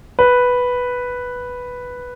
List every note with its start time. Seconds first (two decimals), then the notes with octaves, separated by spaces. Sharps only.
0.19 B4